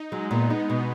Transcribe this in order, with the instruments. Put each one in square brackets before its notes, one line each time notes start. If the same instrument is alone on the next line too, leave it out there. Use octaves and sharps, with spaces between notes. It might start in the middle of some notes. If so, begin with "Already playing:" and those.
Already playing: [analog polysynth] D#4
[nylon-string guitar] F#3 [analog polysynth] G#3
[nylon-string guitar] A#2 [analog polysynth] B3
[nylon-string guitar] D#4
B2